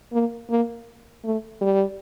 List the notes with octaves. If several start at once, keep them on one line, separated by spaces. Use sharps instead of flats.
A#3
A#3
A3
G3